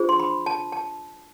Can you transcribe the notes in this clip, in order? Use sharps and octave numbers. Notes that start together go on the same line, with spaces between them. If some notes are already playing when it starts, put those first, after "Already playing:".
Already playing: D4 F4 G#4 C5
C6
B5
A5
A5